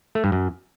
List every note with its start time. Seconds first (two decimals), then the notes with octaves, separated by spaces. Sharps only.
0.15 A3
0.24 G2
0.32 F#2